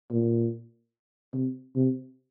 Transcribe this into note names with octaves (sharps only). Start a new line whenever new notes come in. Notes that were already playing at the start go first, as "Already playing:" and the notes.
A#2
C3
C3